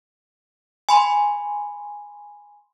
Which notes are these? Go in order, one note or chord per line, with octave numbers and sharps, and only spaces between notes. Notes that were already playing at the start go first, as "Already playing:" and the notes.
G#5 B5 C6